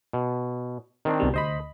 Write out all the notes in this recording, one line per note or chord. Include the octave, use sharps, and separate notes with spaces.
B2
D#3 C4 D4
C2 B2 G3
D2 C5 D#5 B5